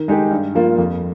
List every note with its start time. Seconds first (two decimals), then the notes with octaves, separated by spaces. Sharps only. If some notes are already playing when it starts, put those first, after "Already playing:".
Already playing: D#3
0.08 G#3 D#4 G4
0.31 G2
0.55 F3 A#3 F4
0.78 F2